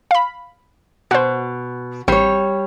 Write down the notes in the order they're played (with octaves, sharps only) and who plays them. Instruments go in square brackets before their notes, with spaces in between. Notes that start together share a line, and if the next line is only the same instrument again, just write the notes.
[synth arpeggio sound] F5 B5
[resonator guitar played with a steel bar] B2 [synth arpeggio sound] F#4 C5
[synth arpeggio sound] A1 C4 C7 [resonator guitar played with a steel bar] G3 C#5